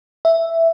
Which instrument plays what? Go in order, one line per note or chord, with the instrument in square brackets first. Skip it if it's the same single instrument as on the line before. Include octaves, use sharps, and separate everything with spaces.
[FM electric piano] E5